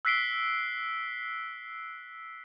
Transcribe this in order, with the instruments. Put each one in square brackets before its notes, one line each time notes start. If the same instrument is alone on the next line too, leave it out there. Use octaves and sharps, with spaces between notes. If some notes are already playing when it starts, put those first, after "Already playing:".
[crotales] E6 F#6 B6 C7 D7 G7